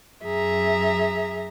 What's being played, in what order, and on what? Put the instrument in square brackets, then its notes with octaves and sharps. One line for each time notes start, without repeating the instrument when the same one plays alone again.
[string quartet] F#2 G#4 E5 A#5